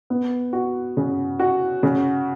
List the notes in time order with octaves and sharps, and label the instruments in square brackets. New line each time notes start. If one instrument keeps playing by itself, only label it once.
[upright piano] B3
F#4
C#3
F#4
C#3